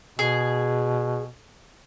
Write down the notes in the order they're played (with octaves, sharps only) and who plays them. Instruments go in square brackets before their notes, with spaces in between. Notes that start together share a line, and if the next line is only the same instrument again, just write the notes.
[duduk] B2 [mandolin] G#4